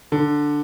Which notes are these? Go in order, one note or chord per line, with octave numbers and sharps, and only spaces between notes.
D3